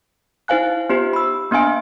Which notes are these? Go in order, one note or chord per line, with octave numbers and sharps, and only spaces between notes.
D#4 E4 C5 F5 G#5 F#6
B3 D#4 F4 G4 C5
B5 E6
A#3 B3 D4 F5 G#5 D7